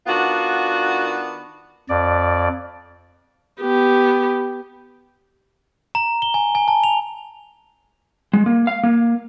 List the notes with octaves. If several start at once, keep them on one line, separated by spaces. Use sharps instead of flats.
D#3 B3 D4 F4 F#4
F2 D5
B3 G4
A#5
G7
G#5
G#5
A5
F7
G#3
A#3
F5
A#3